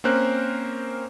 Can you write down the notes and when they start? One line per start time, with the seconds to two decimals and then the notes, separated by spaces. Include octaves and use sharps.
0.04 A#3 C4 C#4 A#4 C5 F#6